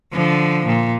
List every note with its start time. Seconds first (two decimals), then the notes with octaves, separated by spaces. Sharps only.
0.13 D3 F3
0.66 A#2